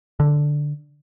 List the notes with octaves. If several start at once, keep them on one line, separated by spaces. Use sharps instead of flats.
D3